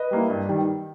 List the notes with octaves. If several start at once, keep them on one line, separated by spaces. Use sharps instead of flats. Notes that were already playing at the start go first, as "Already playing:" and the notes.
Already playing: B4 D#5
G3 A#3 E4
G2
D#3 G3